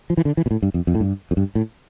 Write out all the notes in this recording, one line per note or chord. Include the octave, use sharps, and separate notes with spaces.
F3
E3
D3
E3
B2
A2
G2
F2
F2
A2
G2
F2
G2
A2